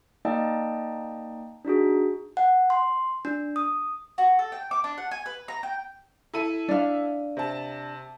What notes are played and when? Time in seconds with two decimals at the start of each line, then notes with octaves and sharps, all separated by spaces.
0.25 A#3 D#4 D5 D#5 G5 A5
1.65 D4 D#4 F#4 G#4
2.37 F#5
2.70 C6
3.25 D4
3.56 D#6
4.18 F#4
4.39 A4
4.52 G5
4.71 D6
4.84 D4
4.98 F#5
5.11 G#5
5.26 B4
5.48 A#5
5.63 G5
6.34 E4 A4 D#7
6.69 D4 F5
7.37 C3 A5